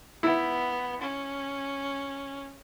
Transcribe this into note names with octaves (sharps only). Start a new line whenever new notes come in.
B3 E4
C#4